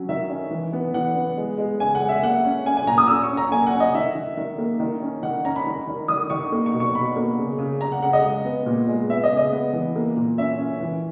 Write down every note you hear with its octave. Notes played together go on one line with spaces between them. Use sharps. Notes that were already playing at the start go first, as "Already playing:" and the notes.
Already playing: F#3 C#4
D#3 E5
C#4
E3
B3
E3 F#5
B3
G#3
G#3
C#3 G#5
F#5
G#3
E5
A#3 F#5
C#4
C#4 G#5
G#5
A#2 A#5
D#6
C#4 E6
C#6
C#4
A#5
A#3 G#5
F#5
C#4
D#5
D#3 E5
D#3
D#3
A#3
D#3
C#4
D#3 F#5
C#4 A#5
B5
D#3
D#3
D#3 D#6
D#3 C#6
A#3
C#6
B2
C#6
B2 B5
A#3
C#3
C#3
C#3 A#5
F#5
C#3 F#5
D#5
G#3
B3
A#2
G#3
B3 E5
D#5
C#3
D#5
B3
E3
A#3
A#2
C#4 E5
C#4
E3